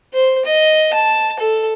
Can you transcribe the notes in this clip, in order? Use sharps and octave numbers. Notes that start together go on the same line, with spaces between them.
C5
D#5
A5
A4